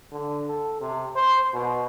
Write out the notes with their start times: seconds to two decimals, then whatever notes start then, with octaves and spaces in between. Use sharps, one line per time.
0.11 D3
0.48 A4
0.81 C3
1.16 C5
1.54 B2